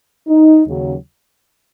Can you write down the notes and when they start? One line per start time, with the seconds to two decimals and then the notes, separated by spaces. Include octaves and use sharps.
0.28 D#4
0.66 D#2 C#3 F#3